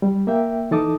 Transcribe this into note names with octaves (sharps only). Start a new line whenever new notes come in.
G3
A#3 E5 G5
E3 D#4 A4 A5 D6 D#6